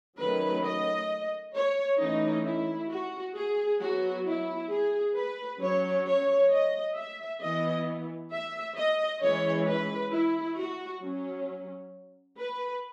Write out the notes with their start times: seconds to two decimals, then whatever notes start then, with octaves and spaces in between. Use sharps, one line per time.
0.18 D#3 F#3 A3 C#4 B4
0.63 D#5
1.54 C#5
1.99 E3 A3 C#4 D#4
2.45 E4
2.90 F#4
3.35 G#4
3.80 F#3 B3 F#4
4.26 E4
4.70 G#4
5.15 B4
5.61 F#3 C#4 C#5
6.06 C#5
6.51 D#5
6.96 E5
7.41 E3 B3 D#5
8.32 E5
8.77 D#5
9.22 E3 G#3 C#4 C#5
9.68 B4
10.12 E4
10.58 F#4
11.02 F#3 C#4
12.38 B4